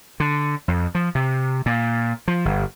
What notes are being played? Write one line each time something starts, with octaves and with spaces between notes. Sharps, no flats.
D3
F2
F3
C3
A#2
F3
G1